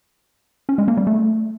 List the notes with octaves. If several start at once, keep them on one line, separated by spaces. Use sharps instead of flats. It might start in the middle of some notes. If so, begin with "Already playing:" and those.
C#4
G#3
A#3
G3
A3